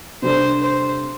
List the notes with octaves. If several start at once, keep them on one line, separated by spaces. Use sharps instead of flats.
C3 G3 D4 A4 C5
C5